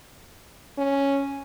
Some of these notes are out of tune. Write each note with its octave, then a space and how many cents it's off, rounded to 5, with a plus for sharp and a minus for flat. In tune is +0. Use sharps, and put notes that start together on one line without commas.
C#4 +0